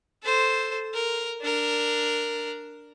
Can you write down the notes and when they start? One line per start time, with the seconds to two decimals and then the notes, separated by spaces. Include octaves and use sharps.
0.23 A4 C5
0.94 A#4
1.42 D4 A#4